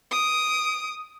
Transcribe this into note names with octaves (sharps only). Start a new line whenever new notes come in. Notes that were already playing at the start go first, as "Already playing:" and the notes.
D#6 D7